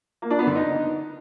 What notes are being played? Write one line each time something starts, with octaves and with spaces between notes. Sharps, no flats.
A#3
D4
B3
D3
D#4